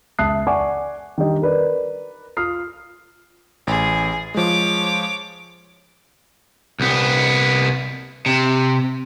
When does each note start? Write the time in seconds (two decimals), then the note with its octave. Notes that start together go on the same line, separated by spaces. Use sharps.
0.19 C#2 E5 A5 D#6 F#6 C7
0.47 D5 F#5 G#5 C#6 D6
1.18 D#3 G3 D4 G4 D#5
1.42 A#4 B4 D5
2.37 F4 D#6 F6 C7
3.67 A1 G#4
4.34 F3 G#3 C#5 D6
6.80 C2 B3
8.26 C3